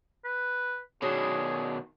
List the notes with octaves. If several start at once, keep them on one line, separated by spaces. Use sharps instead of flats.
B4
B2 D#3 F#3 G#3 D4 G#4